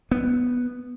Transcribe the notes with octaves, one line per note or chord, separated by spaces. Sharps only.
B3